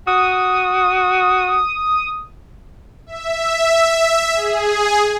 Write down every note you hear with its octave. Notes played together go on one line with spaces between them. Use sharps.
F#4 D#6
E5
G#4